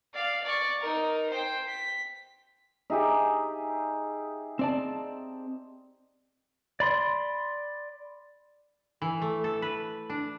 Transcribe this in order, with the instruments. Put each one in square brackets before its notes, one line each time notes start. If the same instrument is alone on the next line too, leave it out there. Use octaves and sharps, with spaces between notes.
[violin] D5 F5
D5 C#6
D#4 A#4
C5 G5
B6
[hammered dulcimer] D#4 [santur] G4 G#4 E5
[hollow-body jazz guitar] C4 D5 A5
[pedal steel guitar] D5 B5 C6
[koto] E3
A3
A4
B4
D4